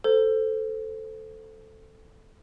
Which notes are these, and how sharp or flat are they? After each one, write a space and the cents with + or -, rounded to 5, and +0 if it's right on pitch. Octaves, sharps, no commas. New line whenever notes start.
A4 +0 C5 -15